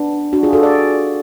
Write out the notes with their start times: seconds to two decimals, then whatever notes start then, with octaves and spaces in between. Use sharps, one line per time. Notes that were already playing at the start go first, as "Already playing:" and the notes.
Already playing: B3 D4
0.33 D4 F#4
0.43 F4 G#4
0.53 F#4 A4
0.63 D5